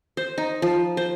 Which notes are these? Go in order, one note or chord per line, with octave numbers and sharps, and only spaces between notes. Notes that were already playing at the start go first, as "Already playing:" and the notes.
C5
D#4
F3
C5